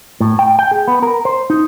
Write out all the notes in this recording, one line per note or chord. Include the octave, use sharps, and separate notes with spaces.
A2
G5
G5
G#4
B3
A#4
C5
D#4